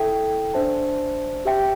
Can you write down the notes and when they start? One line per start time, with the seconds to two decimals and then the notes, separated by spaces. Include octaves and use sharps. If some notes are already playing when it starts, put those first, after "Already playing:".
Already playing: E4 A4 E5 G5
0.54 D4 C5 E5 A5
1.45 G4 E5 G5